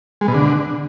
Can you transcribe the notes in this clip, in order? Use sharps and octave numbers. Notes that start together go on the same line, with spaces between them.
G#3
B2
D3